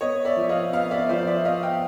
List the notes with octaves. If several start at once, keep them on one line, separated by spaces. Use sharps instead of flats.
B3 C#5 D#5
D5 E5
F3
D#5 F5
B3 D#5 F5
D5 E5
F3 C5 D5
D5 E5
B3 D#5 F5
F5 G5